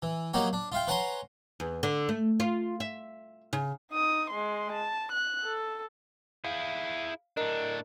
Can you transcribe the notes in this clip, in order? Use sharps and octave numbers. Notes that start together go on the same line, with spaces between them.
E3
F#3 A#3 D#4 F#4 G4 C#5
D4
F4 E5 F5 G5
B4 C#5 F#5 G#5 A#5 C6
E2
D3
A3
F4
E5
C#3
D#4 D#6
G#3 C6
A5
F#6
A4
E4 G#4 F5
A2 D4 A#4 D#5 A#5